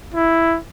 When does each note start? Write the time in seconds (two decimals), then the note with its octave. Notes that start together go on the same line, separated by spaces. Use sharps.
0.14 E4